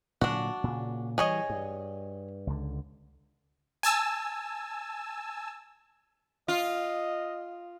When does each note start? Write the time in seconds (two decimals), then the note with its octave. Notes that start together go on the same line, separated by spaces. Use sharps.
0.21 A#2 D3 F#3 D4 F#4
0.64 A#2 C#3
1.18 E3 G3 G#4 C#5 D#5
1.50 G2
2.47 C#2 D3
3.83 G#5 A5 E6
6.48 F4 D#5